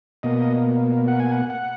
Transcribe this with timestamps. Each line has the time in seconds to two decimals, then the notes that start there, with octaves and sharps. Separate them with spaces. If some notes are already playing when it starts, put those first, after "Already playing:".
0.23 B2 A#3 D#5
1.08 F#5
1.20 G#5
1.32 F#5
1.50 F#5